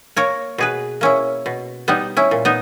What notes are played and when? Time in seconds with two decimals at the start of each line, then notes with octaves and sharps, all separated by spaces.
0.16 A#3 A#4 C#5
0.58 B2 G#4 B4
1.01 A#3 C#4 E4
1.46 B2
1.88 G3 B3 D#4
2.17 C#4 E4
2.31 A#2
2.45 B3 D#4